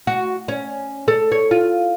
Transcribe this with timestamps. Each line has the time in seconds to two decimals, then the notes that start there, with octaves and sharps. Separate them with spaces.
0.07 F#4
0.48 C#4
1.08 A4
1.32 C#5
1.51 F4